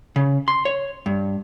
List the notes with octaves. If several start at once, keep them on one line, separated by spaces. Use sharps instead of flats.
C#3
C6
C#5
G2